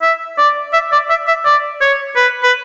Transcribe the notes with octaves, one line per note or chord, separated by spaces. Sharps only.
E5
D5
E5
D5
E5
E5
D5
C#5
B4
B4